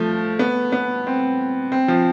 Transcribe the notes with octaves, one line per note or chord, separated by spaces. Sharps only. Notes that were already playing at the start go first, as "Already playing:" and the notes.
Already playing: F3 A3
B3
B3
C4
C4
F3